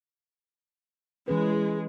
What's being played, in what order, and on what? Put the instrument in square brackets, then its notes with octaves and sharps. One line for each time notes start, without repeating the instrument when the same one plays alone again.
[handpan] E3 C#4 B4 [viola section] G#3